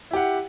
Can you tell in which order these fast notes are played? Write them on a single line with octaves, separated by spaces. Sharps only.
E4 G4 F#5